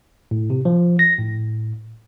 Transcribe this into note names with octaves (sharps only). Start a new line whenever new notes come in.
A2
C3
F3
A#6
A2